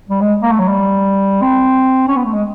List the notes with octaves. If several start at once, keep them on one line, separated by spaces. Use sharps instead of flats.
G3
G#3
A#3
A3
F#3
G3
C4
C#4
B3
A3
G#3